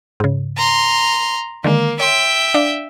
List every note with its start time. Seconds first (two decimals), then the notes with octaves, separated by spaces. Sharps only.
0.20 G#2 C#3
0.57 A#5 C6
1.64 D3 D#3 G#3 A#3
2.00 C#5 E5 G5 C6
2.54 D4 D5 F5